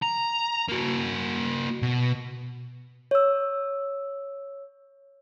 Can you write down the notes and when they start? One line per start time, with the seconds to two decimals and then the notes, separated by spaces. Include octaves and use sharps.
0.02 A#5
0.69 A#3 F#4
1.82 B2
3.11 C#5 E6